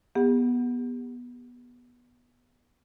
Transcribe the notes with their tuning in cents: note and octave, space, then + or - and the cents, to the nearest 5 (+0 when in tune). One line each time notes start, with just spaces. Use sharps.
B3 -15 G4 +45 F#5 +0